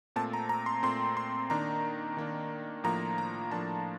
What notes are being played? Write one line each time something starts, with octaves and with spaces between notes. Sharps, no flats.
A#2 A3 C4 A5
A#5
A#5
C6
A#2 A3 C4 C6
C6
D#3 A#3 D4 A#5
D#3 A#3 D4
A2 F3 A#3 D4 A#5
A#5
A2 F3 A#3 D4 A5